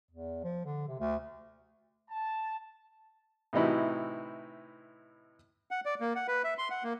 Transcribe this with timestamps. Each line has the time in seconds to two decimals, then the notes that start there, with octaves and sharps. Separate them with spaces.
0.11 E2
0.44 F3
0.65 D3
0.88 C3
1.00 D2
2.09 A5
3.53 A2 C3 E3 D#4 E4 F#4
5.71 F#5
5.85 D5
6.00 A#3
6.16 F#5
6.28 B4
6.44 E5
6.58 C6
6.70 F#5
6.83 A#3